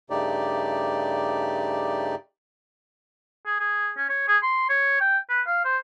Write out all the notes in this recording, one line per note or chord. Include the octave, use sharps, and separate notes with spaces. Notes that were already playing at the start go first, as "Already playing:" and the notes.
G2 C#3 A3 D#4 G4 D5
G#4
G#4
C#4
C#5
G#4
C6
C#5
G5
B4
F5
C5